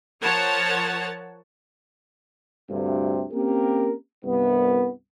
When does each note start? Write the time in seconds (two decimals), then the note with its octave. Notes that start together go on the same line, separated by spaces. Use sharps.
0.22 F3 A#4 C#5 F#5 A5
2.70 D2 G2 C3
3.32 A#3 C4 C#4 G4 A#4
4.24 C2 G2 B3